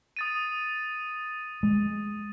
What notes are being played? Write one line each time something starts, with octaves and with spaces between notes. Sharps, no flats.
D#6 A6 D#7
G#3